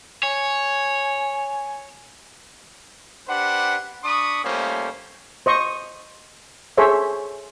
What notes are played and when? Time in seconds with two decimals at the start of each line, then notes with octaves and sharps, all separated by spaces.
0.23 C#5 G#5
3.28 D4 G4 B4 C5 F#5
4.04 D4 B5 C#6 D#6
4.44 G3 A3 A#3 C#4 F4 C5
5.46 C5 D#5 C#6
6.78 G#4 A4 C5 C#5 E5